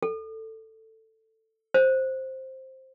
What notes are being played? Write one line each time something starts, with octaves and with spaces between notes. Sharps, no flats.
A4
C5